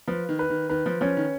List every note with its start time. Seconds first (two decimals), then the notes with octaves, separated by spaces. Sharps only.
0.07 F3 B4
0.29 D#3
0.39 B4
0.50 D#3
0.69 D#3 B4
0.86 F3
1.01 F3 C#4
1.17 D#3